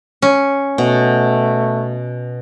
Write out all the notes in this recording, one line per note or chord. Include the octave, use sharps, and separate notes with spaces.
C#4
B2 A3